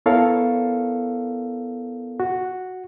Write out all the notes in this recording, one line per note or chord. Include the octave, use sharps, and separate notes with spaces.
B3 E4 A4 A#4 C#5 F5
F#4